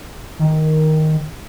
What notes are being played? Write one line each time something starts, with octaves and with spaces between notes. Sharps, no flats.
D#3